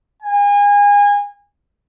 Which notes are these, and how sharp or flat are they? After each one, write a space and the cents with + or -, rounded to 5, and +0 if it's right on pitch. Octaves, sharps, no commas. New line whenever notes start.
G#5 -30